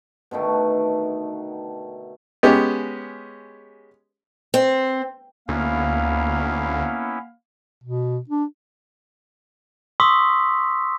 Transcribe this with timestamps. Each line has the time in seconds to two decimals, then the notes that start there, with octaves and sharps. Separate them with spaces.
0.31 B2 D3 D#3 A3
2.43 G#3 B3 C#4 G4
4.54 C4
5.49 D2 A#3 B3 C#4 E4 F5
7.84 B2
8.29 D4
10.00 C6 C#6 D#6 E6 B6